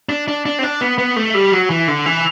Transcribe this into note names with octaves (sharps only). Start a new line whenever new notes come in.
D4
D4
D4
C4
D4
B3
B3
A3
G3
F#3
E3
D3
E3